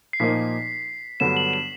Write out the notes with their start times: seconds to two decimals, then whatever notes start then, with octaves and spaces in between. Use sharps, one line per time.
0.13 C7
0.20 A#2 F3 A#3 D#4 B6
1.20 G2 D3 F#3 B3 E7
1.37 F#7
1.53 E7